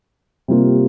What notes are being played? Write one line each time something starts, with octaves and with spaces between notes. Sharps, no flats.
C3 G3 A#3 F4